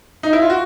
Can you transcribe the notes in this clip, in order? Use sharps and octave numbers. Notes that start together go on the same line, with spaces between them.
D#4
E4
F4
F#4